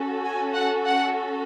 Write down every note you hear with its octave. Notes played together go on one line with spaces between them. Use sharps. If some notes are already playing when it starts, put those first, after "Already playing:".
Already playing: C#4 F#4 A4
G#5
F#5
F#5